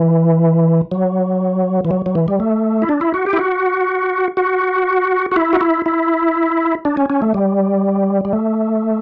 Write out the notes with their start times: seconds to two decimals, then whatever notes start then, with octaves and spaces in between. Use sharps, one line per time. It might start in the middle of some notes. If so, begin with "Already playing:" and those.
Already playing: E3
0.92 F#3
1.85 E3
1.91 F#3
2.06 F#3
2.15 E3
2.28 G3
2.40 A3
2.82 E4
2.89 D4
3.01 E4
3.14 F#4
3.26 G4
3.33 E4
3.39 F#4
4.37 F#4
5.32 F#4
5.36 E4
5.53 F#4
5.61 E4
5.86 E4
6.85 D4
6.97 C#4
7.10 C#4
7.22 A3
7.34 G3
8.25 G3
8.33 A3